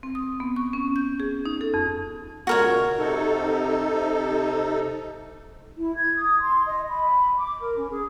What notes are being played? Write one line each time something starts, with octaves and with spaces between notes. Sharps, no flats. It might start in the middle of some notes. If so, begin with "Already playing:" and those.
C4
D#6
B3
C#6
C#4
G6
G#4
D#4
A4
F2
A#2 C#3 G#3 F#4 A#4 C#5
C3 D#4 A4
E4
G#6
D#6
C6
D#5
B5
D6
A#4
C#4
G#4